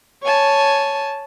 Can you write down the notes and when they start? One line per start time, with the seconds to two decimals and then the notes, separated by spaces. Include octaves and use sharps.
0.22 C#5 G#5 A5